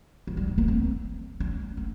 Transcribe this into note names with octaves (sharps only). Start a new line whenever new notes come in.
F3
G3
G#3
A#3
C4
C#4
A#3